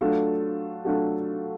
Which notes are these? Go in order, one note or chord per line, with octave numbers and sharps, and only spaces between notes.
F#3 A3 D4 F4 A4
F#3 A3 D4 F4 A4